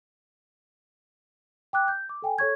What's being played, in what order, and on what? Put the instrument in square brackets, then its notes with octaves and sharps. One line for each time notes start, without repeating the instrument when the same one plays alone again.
[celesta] G5 D6 F#6
G6
D6
A4 G5 G#5
A4 C#5 C#6 G#6